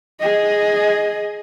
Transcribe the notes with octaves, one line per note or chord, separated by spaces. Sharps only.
G#4 D#5